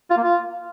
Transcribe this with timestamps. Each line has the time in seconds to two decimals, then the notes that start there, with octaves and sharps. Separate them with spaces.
0.10 F4
0.17 A#3
0.24 F4